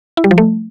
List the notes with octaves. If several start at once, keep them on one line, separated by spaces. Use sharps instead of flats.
E4
G3
F3
A3